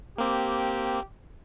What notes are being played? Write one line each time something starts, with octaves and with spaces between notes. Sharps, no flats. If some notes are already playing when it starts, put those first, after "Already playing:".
A#3 C4 G4